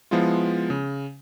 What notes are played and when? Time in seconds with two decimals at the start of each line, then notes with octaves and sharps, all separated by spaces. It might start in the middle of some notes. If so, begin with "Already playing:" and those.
0.11 F3 G#3 B3 E4 F4
0.70 C#3